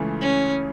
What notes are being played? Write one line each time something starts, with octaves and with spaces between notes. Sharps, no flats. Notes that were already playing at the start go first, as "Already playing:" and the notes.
Already playing: C#2 C#3 E3 A3
C#4